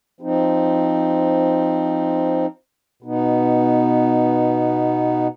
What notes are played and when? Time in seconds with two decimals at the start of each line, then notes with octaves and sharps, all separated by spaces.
0.21 F3 C4 D#4
3.03 B2 B3 D#4